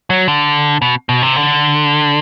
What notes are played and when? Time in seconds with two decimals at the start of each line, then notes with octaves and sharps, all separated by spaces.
0.10 F#3
0.28 D3
0.82 B2
1.09 B2
1.22 C3
1.36 D3